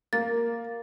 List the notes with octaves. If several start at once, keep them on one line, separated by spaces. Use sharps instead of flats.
A#3 A6